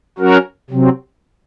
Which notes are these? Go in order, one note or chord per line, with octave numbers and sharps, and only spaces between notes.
F#3 C#4 F#4 A#4
C3 F#3 C4